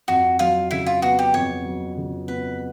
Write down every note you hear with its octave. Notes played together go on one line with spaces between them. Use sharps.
F2 F#4
F#3 F4
C#3 E4
F4
B3 F#4
G4
F2 C#5
F#3
C#3
B3 B4